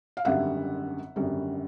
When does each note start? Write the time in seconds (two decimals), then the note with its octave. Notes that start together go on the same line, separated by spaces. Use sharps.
0.17 F5
0.25 G#1 F#2 D3 G3 E5 F#5
1.16 G#1 F#2 D3 G3